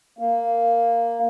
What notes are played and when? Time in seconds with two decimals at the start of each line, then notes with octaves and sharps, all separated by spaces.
0.19 A#3